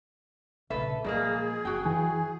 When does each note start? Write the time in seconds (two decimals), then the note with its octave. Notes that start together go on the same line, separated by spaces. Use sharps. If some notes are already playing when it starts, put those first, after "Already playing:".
0.70 A#1 C#3 A4 B4 E5
1.04 A#2 F3 F#3 G#3 A#3 G#4
1.65 F#1 F#4 G5
1.86 F#2 E3 G#5